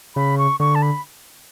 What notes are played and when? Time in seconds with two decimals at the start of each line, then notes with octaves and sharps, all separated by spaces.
0.15 C#3 B5
0.38 C#6
0.60 D3 C#6
0.75 A5
0.82 B5